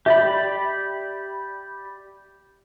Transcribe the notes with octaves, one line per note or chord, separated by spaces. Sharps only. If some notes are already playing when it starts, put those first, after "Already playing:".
G4 D5 E5 B5